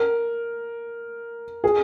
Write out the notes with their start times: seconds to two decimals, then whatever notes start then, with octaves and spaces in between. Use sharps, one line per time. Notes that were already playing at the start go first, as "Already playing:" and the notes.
Already playing: A#4
1.64 G#4